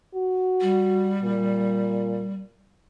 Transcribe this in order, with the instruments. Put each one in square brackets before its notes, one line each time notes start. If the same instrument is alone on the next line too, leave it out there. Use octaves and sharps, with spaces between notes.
[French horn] F#4
[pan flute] G3
[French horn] A#2